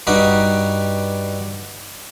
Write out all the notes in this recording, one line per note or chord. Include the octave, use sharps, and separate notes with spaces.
G2 G3 D#4 F#4 G4